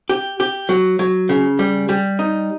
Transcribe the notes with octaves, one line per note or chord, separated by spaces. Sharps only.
G4
G4
F#3
F#3
C#3
G3
G3
D#4